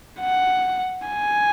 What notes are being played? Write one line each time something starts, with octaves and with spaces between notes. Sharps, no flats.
F#5
G#5